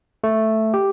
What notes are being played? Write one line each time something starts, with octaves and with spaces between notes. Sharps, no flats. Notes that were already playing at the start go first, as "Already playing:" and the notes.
A3
G4